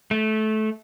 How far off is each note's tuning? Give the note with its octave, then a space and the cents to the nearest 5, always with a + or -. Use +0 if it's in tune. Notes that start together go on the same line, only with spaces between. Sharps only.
A3 -20